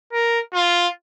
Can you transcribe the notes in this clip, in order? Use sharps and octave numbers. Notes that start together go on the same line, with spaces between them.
A#4
F4